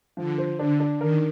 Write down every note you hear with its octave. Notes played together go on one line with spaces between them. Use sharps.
D3 F3
C5
D3 D4
D4
D#3 A#4